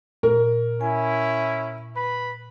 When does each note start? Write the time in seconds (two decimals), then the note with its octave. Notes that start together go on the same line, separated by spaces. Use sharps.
0.23 A#2 A#4
0.81 C#4 E4 G#5
1.97 B4 B5